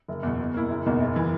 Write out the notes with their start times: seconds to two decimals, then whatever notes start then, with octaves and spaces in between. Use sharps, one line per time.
0.08 F#1
0.23 E2 B2
0.38 B2
0.54 A#3 E4
0.69 F#1
0.86 E2 B2 A#3 D#4
1.00 F#1
1.16 E3